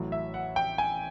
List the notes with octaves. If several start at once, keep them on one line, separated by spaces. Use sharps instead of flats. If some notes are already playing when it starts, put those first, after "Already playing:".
Already playing: A1 A2 F#3
E5
F#5
G5
G#5